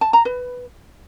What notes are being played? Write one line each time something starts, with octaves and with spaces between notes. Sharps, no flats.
A5
A#5
B4